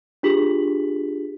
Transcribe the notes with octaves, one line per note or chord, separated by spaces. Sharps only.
D4 F4 G4 G#4 B6 F#7